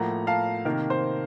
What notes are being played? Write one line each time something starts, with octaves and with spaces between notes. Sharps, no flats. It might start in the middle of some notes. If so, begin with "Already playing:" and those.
Already playing: A2 F3 A#3 F#5 A#5
F5 A5
C3 D#3 A#3 A#4
C5